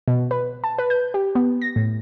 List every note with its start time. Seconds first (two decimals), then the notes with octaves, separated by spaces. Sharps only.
0.08 B2
0.31 B4
0.64 A5
0.78 B4
0.90 G6
1.14 G4
1.35 B3
1.62 A#6
1.76 A2